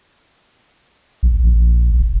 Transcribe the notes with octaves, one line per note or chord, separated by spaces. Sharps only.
A#1
A#1
E1